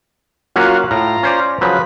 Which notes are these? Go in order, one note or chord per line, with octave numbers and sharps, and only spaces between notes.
F#3 A#3 C#4 F4 F#4
A2 F4 A#5
C#4 C5 D5
C#3 F3 F#3 B4